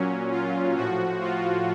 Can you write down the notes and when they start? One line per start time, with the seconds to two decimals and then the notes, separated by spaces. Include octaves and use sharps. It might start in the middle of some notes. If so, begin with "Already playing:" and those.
Already playing: A#2 F#3 C#4
0.31 F4
0.75 A2 F3 F#4
1.21 F4